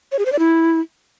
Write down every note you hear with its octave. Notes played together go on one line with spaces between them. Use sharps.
C#5
G#4
C5
D5
E4